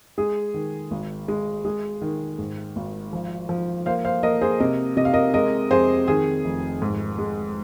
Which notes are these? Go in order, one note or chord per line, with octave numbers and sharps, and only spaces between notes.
G#3 G#4
D#3
G#1
G#3
G#3 G#4
D#3
G#2
G#1
F3
F3
A#3 C5 F5
C5 F5
A#3 A#4 D#5
G#4 C5
C3 A#4 D#5
C3 D#5
F5
A#4 D#5
G#3 A#4 D#5
F2 G#4 C5
D#3 G#4
F1
G#2
G#3